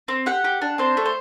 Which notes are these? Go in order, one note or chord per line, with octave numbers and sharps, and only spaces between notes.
C4
G4 F#5
G4
D4
C4 C5
A3
C5